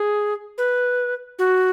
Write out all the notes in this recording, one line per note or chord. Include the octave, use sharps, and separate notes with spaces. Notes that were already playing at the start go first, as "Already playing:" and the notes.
Already playing: G#4
B4
F#4